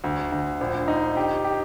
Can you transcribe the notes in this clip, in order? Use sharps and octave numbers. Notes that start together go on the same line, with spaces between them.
D2
D2
A#1
D#4
G4
G4